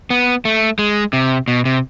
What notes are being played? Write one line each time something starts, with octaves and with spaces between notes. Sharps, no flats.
B3
A3
G#3
C3
B2
C3